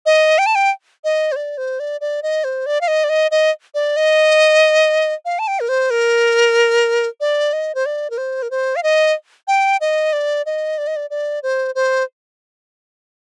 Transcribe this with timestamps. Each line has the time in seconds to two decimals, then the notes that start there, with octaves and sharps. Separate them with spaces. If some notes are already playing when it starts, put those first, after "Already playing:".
0.06 D#5
0.38 G5
0.46 A5
0.55 G5
1.04 D#5
1.32 C5
1.36 D5
1.58 C5
1.80 D5
2.01 D5
2.23 D#5
2.44 C5
2.66 D5
2.81 F5
2.88 D#5
3.04 D5
3.09 D#5
3.31 D#5
3.74 D5
3.96 D#5
5.25 F5
5.39 A5
5.48 G5
5.60 A#4
5.69 C5
5.90 A#4
7.21 D5
7.53 D#5
7.75 C5
7.86 D5
8.10 A#4
8.18 C5
8.42 A#4
8.51 C5
8.76 F5
8.83 D#5
9.48 G5
9.81 D#5
10.13 D5
10.46 D#5
10.78 D5
10.87 D#5
10.96 D5
11.10 D5
11.43 C5
11.75 C5